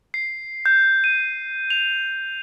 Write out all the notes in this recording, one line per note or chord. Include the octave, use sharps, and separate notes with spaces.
C7
G6
D#7
F7